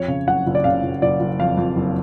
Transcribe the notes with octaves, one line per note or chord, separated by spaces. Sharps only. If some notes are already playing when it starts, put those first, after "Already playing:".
Already playing: F2 C#5
C#3
F#1 F#5
F#1
D5
C#3 F5
F#1
F#1 D5
F#1
F2 F5
F2
F#1